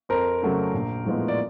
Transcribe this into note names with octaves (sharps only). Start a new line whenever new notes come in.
F2 A#4 C5
C#3 F#3 A3 C#4
A#1
A2 F3 G#3 B3
D5